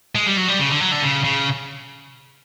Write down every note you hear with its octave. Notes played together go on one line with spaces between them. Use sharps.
G#3
G3
F#3
G3
C#3
D3
F#3
D3
C#3
C#3